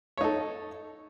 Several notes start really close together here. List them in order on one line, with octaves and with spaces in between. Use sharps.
C#5 D#4 A4